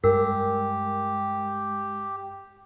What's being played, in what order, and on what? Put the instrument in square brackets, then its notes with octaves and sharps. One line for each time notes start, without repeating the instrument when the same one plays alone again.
[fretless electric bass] G2 [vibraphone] G#3 [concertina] G4 [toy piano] A#4